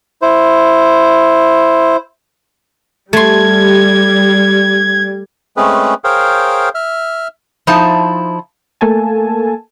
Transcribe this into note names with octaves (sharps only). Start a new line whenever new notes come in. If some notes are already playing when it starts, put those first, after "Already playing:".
E4 C5
G3 A3 C6 G#6
G#3 A3 C4 C#4 G#4 B4
G#4 A#4 C5 C#5 F5 G5
E5 F6
F3 D#4 E4 C5 A5
A3 A#3 A4 G#5 A5